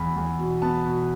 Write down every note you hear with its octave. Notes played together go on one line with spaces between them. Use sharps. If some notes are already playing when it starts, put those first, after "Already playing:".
Already playing: E2 B5
E2
B2
B3 A5
B2